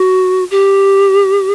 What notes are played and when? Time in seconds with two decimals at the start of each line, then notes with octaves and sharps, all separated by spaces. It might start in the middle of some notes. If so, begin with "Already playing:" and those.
Already playing: F#4
0.51 G4